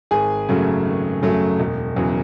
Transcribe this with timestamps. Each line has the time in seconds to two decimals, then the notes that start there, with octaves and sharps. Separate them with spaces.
0.11 G#1 G#4 G#5
0.49 F#2 C#3 F#3 A3
0.85 G#1
1.22 F#2 C#3 F#3 A3
1.60 E1
1.96 E2 C#3 F#3